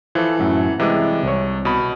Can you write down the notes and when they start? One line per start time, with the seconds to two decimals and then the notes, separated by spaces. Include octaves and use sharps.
0.15 E3 F3 A4
0.40 F#2 A2
0.80 C3 E3 G3 G#3 D6
1.23 C2 C#5
1.65 B2 B5